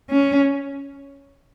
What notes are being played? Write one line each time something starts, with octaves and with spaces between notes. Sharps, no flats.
C#4